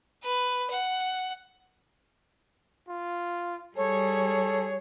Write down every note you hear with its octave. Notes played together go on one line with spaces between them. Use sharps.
B4
F#5
F4
G3 G#4 A4 C#5